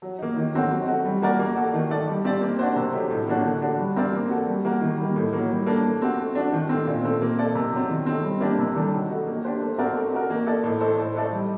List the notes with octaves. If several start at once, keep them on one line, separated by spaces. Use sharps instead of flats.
F#3
A#3 D#4
D#3
F#3 A3 C4 F#4
F#3
A3 D#4 F#4
G3
A#3 F#4 A#4 D5
A#3
F#4 A4
D#3
A3 D#4 A4 D5
G3
C4 G4 D5
A#3
D4 F#4 C5
C3
F#3 A3 D#4 G4
A2
F#3 A#3 D4 F#4
D3
A3 D4 F#4
G3
C4 G4 A#4 D5
A#3
F#4 A4
G3
A#3 F#4 A#4
D#3
G3 A#3
A2
F#3 A#3
G3
A#3 D4 A4
A3
C4 F#4
A3
D4 F#4
D#3
A3 C4
A#2
A3 C4
A#3
D#4 A4 D5
C3
F#3 C4
D#3
A3 C4
G3
A#3 D4 G4 D5
C3
D#3 G3 D4 A4
F#3
A3 D#4 F#4
A#3
D4 G4 C5
A3
C4 F#4 A#4 D5
A3
D#4 F#4 A#4
A#3
D#4 A4 D5
A2
A3 D#4 A4 C5
A2
A3 D#4 A4 D5
G3